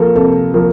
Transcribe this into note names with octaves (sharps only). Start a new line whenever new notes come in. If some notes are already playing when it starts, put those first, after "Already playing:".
Already playing: F3 A#3 F4 A4 A#4
C3 A4
F3 A#3